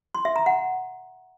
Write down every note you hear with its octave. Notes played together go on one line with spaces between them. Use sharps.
C6
E5
A#5
F#5